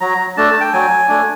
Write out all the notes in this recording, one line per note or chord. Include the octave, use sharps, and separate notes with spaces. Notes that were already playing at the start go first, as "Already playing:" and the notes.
F#3 A#5
A3 D4 A5
G5
F#3 G#5
A3 D4